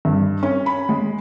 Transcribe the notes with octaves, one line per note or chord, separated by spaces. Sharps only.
G2
C#4
B5
G#3